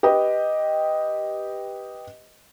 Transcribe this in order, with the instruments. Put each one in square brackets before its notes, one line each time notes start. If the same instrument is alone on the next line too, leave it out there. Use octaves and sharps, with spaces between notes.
[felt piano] G4 B4 D#5